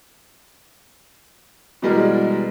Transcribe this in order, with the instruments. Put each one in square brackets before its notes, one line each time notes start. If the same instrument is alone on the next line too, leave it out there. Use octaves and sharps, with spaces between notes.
[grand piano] B2 E3 G3 G#3 A#4